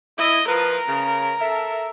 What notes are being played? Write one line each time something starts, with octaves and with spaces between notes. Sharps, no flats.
E4 D#5
F3 A#4 B4
C#3
A4 E5